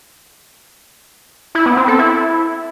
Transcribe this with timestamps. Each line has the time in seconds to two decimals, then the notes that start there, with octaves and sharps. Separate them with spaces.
1.55 E4
1.66 B3
1.77 C4
1.88 A4
1.99 E4